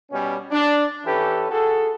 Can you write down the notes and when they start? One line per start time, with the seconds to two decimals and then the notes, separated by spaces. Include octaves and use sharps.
0.11 B2 G3 C#4
0.51 D4
1.04 E3 C#4 G4 A4 B4
1.49 F#4 G#4 A4